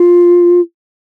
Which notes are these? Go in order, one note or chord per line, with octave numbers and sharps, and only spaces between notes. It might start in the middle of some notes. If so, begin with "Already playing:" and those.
Already playing: F4